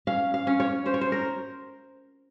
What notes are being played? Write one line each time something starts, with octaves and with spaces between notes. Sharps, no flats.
C#4 F5
F5
C#4
C#5
C#4 C5
C#5
C5
A#4